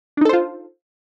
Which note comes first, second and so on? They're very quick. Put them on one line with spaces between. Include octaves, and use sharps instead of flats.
D4 D#4 A4 C5 F4